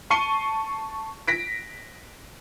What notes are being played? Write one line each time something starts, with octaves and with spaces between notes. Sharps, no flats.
A5 C#6 C7 C#7 D#7 G7
A#6 B6 D7